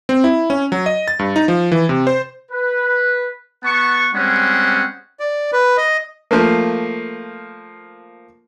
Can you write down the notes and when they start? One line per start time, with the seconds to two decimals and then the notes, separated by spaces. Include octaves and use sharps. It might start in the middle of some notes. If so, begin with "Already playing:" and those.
0.09 C4
0.24 E4
0.50 C#4
0.72 F#3
0.86 D#5
1.08 A6
1.19 G2
1.36 D#4
1.48 F3
1.72 E3
1.89 C3
2.07 C5
2.52 B4
3.63 B3 F#5 A5 C#6
4.13 G3 G#3 C4 C#4 F#5
5.20 D5
5.53 B4
5.77 D#5
6.31 F3 A3 A#3